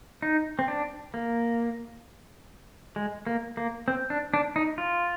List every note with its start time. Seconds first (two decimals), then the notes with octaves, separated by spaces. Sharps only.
0.22 D#4
0.59 C4
0.68 D4
1.14 A#3
2.96 G#3
3.27 A#3
3.57 A#3
3.88 C4
4.10 D4
4.34 D4
4.56 D#4
4.78 F4